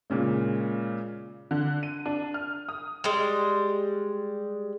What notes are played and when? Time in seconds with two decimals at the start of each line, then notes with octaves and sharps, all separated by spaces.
0.10 A#2 C#3 G#3
1.51 D3
1.83 D#7
2.06 D4
2.34 F6
2.69 D#6
3.04 G3 G#3